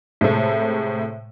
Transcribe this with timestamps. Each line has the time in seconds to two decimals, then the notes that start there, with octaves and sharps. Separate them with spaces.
0.21 A2 C3 G#3 A3